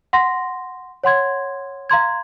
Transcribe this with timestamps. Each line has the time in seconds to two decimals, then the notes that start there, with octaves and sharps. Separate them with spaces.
0.13 F#5 C6 A#6
1.04 C#5 F#5 C6 G#6
1.90 F5 A#5 C6 G#6